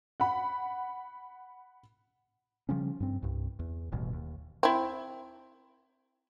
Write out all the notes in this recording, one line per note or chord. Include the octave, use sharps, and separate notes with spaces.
F#5 B5
C#3 F3 G3 C#4
G2 C4
C2 G2
E2
D#1 A1 G2 B2
D#2
C4 E4